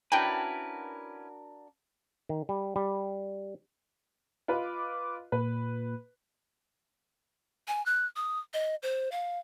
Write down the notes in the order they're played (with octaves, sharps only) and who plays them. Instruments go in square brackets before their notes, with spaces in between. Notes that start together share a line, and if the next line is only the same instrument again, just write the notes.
[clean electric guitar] C#4 E4 B4 [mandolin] D4 F#4 A#4 [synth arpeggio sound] G5
[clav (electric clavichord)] D#3
G3
G3
[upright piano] F4 B4 D#5 [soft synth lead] D6
[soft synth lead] A#2 [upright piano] B4
[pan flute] G#5
F#6
D#6
D#5
C5
F5